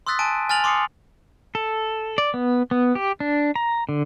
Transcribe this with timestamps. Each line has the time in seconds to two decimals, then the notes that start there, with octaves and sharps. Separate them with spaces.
0.07 C6 D#6 E6 F#6 A6 B6
0.19 G#5 A5 D7 D#7
0.50 G#5 F6 A6 F7 F#7
0.64 C6 D6 D#6 C7 C#7
1.55 A4
2.18 D5
2.34 B3
2.71 B3
2.95 G4
3.20 D4
3.56 A#5
3.89 D3